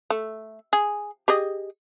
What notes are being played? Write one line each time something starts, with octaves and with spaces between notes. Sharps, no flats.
A3
G#4
G4 G#4 D#5